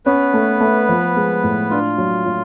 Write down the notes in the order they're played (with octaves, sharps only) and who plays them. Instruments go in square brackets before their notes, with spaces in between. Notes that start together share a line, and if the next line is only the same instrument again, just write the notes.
[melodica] B3 B4 [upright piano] C#4
[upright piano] A3
A3
F3
G#3
A2
[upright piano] D4 [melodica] F4
[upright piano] F#3
F#3